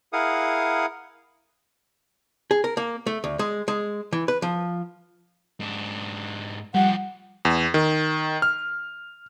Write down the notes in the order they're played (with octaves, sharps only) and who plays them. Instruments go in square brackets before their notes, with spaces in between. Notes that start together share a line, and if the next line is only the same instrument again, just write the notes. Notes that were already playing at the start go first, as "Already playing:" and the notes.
[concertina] E4 G#4 A#4 F5 F#5 D#6
[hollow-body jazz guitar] G#4
A#4
A#3
A3
D2
G#3
G#3
E3
B4
F3
[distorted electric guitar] G#2 D4
[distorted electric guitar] F3 G4 [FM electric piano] G3 [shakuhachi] F#5
[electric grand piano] E2
D#3
F6